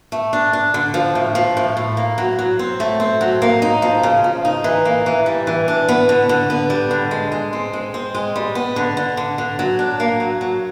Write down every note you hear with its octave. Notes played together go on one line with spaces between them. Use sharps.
A3
D4
D4
D3
F3
A2
F3
A2
A2
A#3
F#3
F#3
C4
A3
C4
F#3
A#3
D#4
F3
C#3
F3
D#4
E3
A#3
E3
G3
E3
D4
B3
D3
D3
B3
G3
D3
G#3
G#3
C4
G#3
C4
G#3
G3
B3
D3
D3
D3
D3
F#3
D4
A#3
F#3
F#3